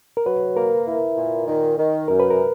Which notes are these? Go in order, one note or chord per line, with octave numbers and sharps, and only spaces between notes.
A#4
F#3 B4
A#3 A#4
E4
A#2
D#3
D#3
F#2 A#4
B4
A#4